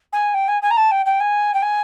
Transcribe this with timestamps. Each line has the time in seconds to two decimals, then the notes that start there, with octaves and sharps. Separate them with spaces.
0.12 G#5
0.34 G5
0.48 G#5
0.62 G#5
0.70 A#5
0.76 A5
0.91 G5
1.05 G5
1.20 G#5
1.53 G5
1.62 G#5